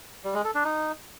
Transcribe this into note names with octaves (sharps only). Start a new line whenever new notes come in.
G3
G#3
A4
D4
D#4